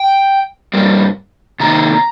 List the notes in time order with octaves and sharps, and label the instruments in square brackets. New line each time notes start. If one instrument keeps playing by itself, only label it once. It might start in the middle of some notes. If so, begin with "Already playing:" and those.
Already playing: [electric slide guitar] G5
G2 G3 A#3
C3 D#3 A#3 D#4 A#5